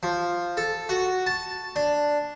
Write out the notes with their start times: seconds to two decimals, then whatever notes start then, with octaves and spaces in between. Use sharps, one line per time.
0.03 F3
0.57 A4
0.89 F#4
1.26 A5
1.76 D4